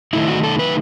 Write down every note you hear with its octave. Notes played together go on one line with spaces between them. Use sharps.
D#3 A3 D#4 E4
F#4
A4
B4